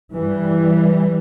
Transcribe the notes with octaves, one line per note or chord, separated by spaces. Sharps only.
G2 E3 G3